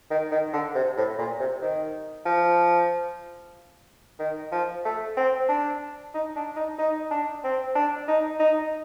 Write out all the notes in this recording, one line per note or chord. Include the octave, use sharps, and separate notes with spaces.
D#3
D#3
D3
C3
A2
A#2
C3
D#3
F3
D#3
F3
A3
C4
D4
D#4
D4
D#4
D#4
D4
C4
D4
D#4
D#4